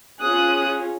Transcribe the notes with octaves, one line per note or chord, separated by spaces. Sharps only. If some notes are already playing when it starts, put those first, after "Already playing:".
C#4 F4 G#4 D#6 F#6